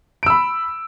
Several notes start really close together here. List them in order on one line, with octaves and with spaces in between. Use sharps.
D7 E6 B5